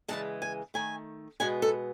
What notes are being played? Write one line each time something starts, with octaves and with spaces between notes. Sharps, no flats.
C#3 E3 G#3 A5
G#5
D#3 A3 G#5
B2 G#3 B3 G#5
A4